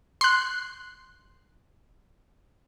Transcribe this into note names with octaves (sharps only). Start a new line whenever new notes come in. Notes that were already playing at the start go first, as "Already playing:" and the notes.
C6 F#6